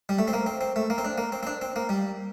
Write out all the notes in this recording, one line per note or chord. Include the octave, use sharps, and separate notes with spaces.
G3
A3
C4
A#3
C4
C4
A3
A#3
C4
D4
A#3
C4
C4
D4
C4
A#3
G3